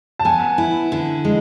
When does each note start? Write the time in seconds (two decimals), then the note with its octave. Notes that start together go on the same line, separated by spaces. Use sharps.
0.19 A5
0.25 B3 G#5
0.58 E4
0.92 D3
1.25 G#3